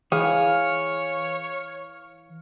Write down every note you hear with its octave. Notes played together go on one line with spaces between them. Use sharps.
E3 G#4 C#5 F5